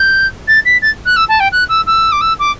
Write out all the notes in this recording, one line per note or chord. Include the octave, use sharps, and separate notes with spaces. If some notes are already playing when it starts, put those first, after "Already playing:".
Already playing: G6
A6
B6
A6
F#6
E6
A5
G5
F#6
E6
E6
D6
E6
D6